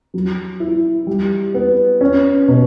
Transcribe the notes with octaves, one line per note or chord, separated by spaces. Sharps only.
F#3
E4
G3
B3
C#4
B2